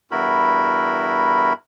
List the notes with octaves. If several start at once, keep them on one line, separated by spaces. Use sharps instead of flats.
E2 G2 E4 F#4 A#4 B5